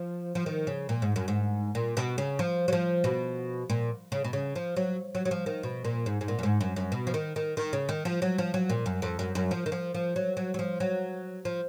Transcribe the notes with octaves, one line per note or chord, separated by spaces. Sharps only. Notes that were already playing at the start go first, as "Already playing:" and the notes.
Already playing: F3
F3
D#3
C#3
A#2
G#2
F#2
G#2
A#2
B2
C#3
F3
F#3
F3
B2
A#2
C#3
B2
C#3
F3
F#3
F#3
F#3
F3
D#3
B2
A#2
G#2
G#2
A#2
F#2
G#2
F#2
F#2
B2
F3
D#3
D#3
D#3
C#3
D#3
F3
F#3
F3
F#3
A#2
F#2
F2
F#2
F#2
F3
D#3
F3
F3
F#3
F#3
F#3
F3
F#3
F3